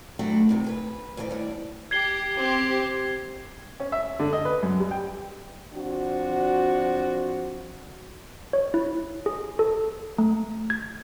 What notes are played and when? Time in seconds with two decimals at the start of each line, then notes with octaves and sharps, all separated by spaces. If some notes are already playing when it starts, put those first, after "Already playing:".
0.19 F#3 A3 D4 E4 F#4 G4
0.49 G#2 C3 D#3
0.64 G#4 A4 B4
1.17 D2 E3 G#4 B4 D5 D#5
1.30 D#2 G3 D4
1.91 G4 G#6 C7 G7
2.36 C4 G4
3.80 C#4
3.92 E5
4.19 D3
4.33 D#5
4.45 B4
4.63 F#2
4.80 G3
4.91 G5
5.73 F3 C4 D4 F#4
8.53 C#5
8.74 E4
9.26 G#4
9.59 A4
10.18 A3
10.70 G#6